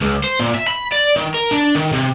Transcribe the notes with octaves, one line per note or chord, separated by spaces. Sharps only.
C#2
C5
A#2
E5
B5
D5
D#3
A#4
D4
D#3
C3